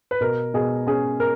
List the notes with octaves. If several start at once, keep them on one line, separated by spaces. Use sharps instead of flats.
B4
B2 A#4
B2 G#4
C#4 G#4
A#4